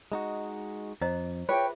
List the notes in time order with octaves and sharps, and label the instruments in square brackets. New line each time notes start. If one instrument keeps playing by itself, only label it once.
[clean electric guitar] G#3 D#4 F#4
[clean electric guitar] F2 [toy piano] C5 D#5 A#5
[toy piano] F4 G#4 E5 [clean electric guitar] B4 [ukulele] C#5 [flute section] G5